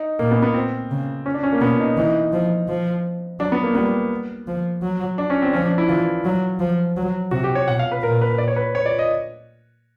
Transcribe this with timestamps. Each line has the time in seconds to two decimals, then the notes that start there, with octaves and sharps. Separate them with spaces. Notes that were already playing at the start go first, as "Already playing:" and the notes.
Already playing: D#4
0.19 A#2 A#3
0.31 B3
0.42 B3
0.54 C4
0.91 C#3
1.26 C#4
1.34 D4
1.43 C#4
1.53 A#3
1.61 B2 B3
1.80 D#4
1.97 E3 D#4
2.33 F3
2.69 F3
3.39 F#3 D4
3.52 B3
3.63 A#3
3.75 G3 B3
4.47 F3
4.83 F#3
5.18 D4
5.30 C#4
5.42 C4
5.53 F3 C#4
5.65 D4
5.78 E4
5.89 E3 F4
6.25 F#3
6.60 F3
6.97 F#3
7.31 C3 F#4
7.44 G4
7.55 C#5
7.68 B2 F#5
7.79 F5
7.92 B4
8.02 A#2 A#4
8.21 B4
8.38 D5
8.48 C#5
8.56 B4
8.75 C#5
8.86 D5
8.99 D#5